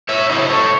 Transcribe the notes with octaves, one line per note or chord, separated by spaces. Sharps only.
C#5 E5
C#3 F#3 C#4 E4 C5 D#5
A4 C#5